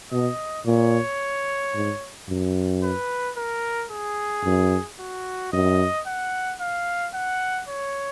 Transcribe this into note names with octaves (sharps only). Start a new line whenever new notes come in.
B2 D#5
A#2 C#5
G#2
F#2
B4
A#4
G#4
F#2
F#4
F#2 D#5
F#5
F5
F#5
C#5